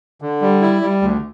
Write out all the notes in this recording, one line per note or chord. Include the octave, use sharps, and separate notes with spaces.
D3
G3
E4
G3
D2